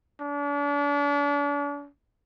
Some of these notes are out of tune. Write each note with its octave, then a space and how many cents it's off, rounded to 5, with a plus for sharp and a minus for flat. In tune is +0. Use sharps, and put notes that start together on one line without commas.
D4 -40